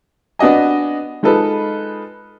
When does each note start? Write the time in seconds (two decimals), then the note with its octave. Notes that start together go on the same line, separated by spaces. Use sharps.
0.39 B3 D4 F#4 D#5 G#5
1.23 G#3 D#4 F4 A4 B4